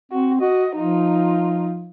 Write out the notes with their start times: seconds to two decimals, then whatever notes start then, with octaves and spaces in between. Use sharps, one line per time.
0.12 C4 F#4
0.41 F#4 D#5
0.76 F3 D#4 F4